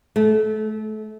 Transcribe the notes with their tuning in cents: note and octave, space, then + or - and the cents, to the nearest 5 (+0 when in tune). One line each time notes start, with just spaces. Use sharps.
A3 -30